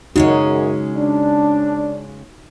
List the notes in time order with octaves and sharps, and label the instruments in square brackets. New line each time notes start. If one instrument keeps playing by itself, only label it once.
[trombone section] F#2 [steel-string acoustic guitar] C#3 G#3 C#4 [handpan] D#4 F#4
[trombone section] D4